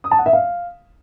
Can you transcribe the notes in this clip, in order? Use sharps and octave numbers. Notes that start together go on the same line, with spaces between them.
D#6
A5
F#5
E5
F5